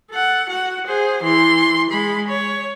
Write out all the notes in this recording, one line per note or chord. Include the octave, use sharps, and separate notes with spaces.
A4 F#5
F#4 F#5
G#4 C5
E3 C6
G#3 B5
C#5